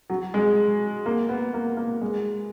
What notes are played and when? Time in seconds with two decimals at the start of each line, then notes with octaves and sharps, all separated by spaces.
0.10 F#3
0.34 G#3
1.06 A#3
1.29 B3
1.54 A#3
1.77 A#3
2.01 G#3